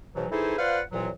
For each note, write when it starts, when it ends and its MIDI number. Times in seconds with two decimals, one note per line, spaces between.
0.15 0.26 44
0.15 0.26 47
0.15 0.26 52
0.15 0.26 54
0.32 0.56 52
0.32 0.56 63
0.32 0.56 64
0.32 0.56 68
0.32 0.56 69
0.32 0.56 72
0.58 0.81 65
0.58 0.81 71
0.58 0.81 72
0.58 0.81 74
0.58 0.81 77
0.58 0.81 78
0.92 1.09 36
0.92 1.09 46
0.92 1.09 52
0.92 1.09 54